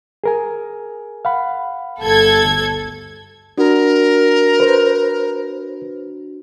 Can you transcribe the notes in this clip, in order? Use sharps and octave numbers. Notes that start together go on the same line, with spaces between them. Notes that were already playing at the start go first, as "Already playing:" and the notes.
G#4 A#4 G#5
F5 F#5 B5
G1 A4 G#6
D2
D4 F#4 A#4
B4 C5